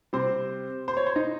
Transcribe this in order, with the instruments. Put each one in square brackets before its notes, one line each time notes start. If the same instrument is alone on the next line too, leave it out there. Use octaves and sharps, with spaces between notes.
[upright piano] C3 G3 C4 C5
C5
C#5
C5
D#4